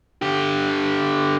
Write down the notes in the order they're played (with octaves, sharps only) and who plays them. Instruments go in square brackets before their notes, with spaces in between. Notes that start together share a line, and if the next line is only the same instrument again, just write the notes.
[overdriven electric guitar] D3 G4